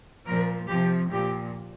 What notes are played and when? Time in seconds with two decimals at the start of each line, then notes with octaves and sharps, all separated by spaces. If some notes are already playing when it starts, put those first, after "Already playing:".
0.26 A#2 F3 A#4
0.68 C3 F3 G4
1.11 A#2 F3 G4